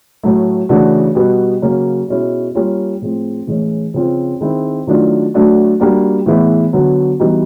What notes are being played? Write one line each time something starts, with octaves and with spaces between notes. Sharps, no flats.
A2 F#3 A3
C#3 E3 A3 D4 F#4
B2 G3 B3
C#3 F#3 A#3 C#4
B2 G#3 C#4 E4
G3 A#3 C#4 F4
A2 F3 G#3 C4
A2 E3 G#3 C#4
C#3 F3 G#3 C4 F4
D#3 G#3 C4 E4
D#3 F#3 A3 D4 F4
F#3 A3 D4 F#4
G3 A#3 D4 F#4
A2 E3 G#3 B3 E4
D3 F#3 B3
E3 G3 B3 D#4 F#4